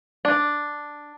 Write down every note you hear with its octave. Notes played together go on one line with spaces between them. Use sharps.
D4